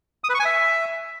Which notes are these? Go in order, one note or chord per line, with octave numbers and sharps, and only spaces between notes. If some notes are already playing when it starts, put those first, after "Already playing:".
D#6
B4
C#6
G#5
E5